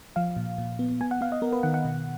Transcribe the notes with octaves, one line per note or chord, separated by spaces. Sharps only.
F3 F5
A#2
A#2
B3
B3 G#5
F#5
B3 F5
D#5
B3 A#4
B4
D#3 F#5
F#5
B2